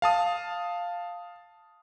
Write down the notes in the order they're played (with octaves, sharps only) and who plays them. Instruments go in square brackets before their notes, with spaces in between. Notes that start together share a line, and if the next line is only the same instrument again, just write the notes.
[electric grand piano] F5 A5 D#6